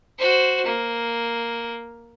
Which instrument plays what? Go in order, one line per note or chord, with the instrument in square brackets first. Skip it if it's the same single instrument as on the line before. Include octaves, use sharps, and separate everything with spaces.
[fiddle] F#4 C5
A#3